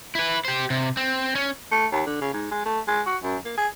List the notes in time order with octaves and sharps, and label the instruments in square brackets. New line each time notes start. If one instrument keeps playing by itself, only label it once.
[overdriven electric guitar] E4 B4
G4 C5
C3
C4
C#4
[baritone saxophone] A3
D#2
D3
C#3
G#2
G#3
A3
G#3
F#4
F#2
A#3
G#4